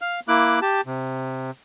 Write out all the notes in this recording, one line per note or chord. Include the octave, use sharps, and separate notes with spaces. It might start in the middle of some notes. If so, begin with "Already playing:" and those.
F5 F6
A#3 E4 D6 F#6
G4 A5
C3